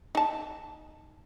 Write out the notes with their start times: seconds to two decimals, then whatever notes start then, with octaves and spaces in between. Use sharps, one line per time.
0.15 D#4 A5